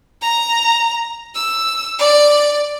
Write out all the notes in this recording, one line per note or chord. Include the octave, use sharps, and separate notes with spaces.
A#5
E6
D5